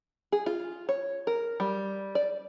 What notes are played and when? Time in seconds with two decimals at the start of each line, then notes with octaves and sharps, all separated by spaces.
0.32 G#4
0.46 F4
0.89 C#5
1.27 A#4
1.60 G3
2.15 D5